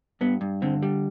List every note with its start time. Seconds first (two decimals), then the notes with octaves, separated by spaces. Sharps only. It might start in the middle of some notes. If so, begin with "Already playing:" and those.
0.21 G2 B3
0.41 G2
0.62 D3 C4
0.83 G3